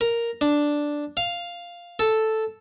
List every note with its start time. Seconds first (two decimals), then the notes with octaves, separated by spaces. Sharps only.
0.01 A#4
0.41 D4
1.17 F5
1.99 A4